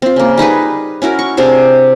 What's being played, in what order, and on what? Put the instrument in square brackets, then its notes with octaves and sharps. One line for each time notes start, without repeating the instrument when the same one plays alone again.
[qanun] C4 F4
C#3 A#3
G3 D#4 G#4 B4
C#4 E4 F#4 A#4
C#6
C3 D4 G#4 C5